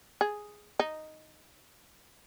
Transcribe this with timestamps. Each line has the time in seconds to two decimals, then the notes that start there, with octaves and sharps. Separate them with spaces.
0.21 G#4
0.79 D#4